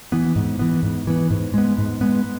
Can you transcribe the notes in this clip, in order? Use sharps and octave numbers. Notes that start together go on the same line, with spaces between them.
E3 B3
G#2
E3 B3
G#2
E3 B3
G#2
G#3 B3
G#2
G#3 B3